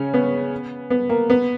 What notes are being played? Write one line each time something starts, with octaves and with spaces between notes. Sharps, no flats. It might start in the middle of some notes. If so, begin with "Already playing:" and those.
Already playing: C#3 C#4
B3
B3
A#3
B3